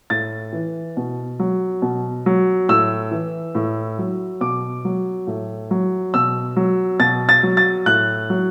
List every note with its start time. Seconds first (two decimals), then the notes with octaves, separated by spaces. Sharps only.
0.10 A2 A6
0.53 E3
0.97 B2
1.39 F#3
1.82 B2
2.26 F#3
2.69 A2 E6
3.11 E3
3.55 A2
3.99 F#3
4.41 B2 D6
4.85 F#3
5.27 A2
5.71 F#3
6.14 B2 E6
6.56 F#3
7.00 B2 A6
7.29 A6
7.43 F#3
7.57 A6
7.86 A2 F#6
8.30 F#3